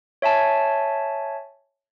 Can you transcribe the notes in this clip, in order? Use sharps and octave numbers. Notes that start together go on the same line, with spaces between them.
C#5 E5 G#5 A5